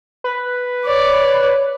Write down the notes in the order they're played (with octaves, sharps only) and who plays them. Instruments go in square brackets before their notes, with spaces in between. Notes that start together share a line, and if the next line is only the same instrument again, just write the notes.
[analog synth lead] B4
[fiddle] C#5 D5